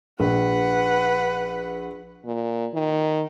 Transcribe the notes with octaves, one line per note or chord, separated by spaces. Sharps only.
A#1 B4 F#5
A#2
D#3